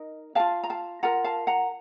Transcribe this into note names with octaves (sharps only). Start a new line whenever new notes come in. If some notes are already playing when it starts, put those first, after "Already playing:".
Already playing: D#4 A#4 D#5
F4 A#4 F5 A5
A#5
F5 A5
F4 A#4 F#5 A#5
F5 A5
F#5 A#5